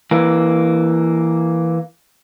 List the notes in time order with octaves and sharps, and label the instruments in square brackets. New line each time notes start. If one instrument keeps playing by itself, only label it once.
[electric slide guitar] E3 A#3